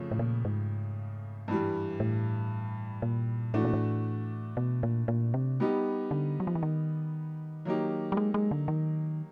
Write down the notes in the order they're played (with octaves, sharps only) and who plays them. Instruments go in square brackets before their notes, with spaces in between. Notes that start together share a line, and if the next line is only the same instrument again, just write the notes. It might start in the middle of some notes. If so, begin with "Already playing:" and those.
Already playing: [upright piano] F2 C#3 F3 A3
[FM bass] A2
A#2
G#2
[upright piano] G2 E3 G3
[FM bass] A2
A#2
[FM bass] A2 [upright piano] E3 A3 D4 F#4
[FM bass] A#2
A2
B2
A#2
A#2
C3
[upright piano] G3 B3 D#4 G4
[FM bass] D3
F#3
F3
E3
D#3
[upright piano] F#3 A#3 D#4 G4
[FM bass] G3
G#3
G#3
D3
D#3